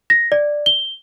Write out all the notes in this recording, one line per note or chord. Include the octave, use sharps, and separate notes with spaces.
A#6
D5
G7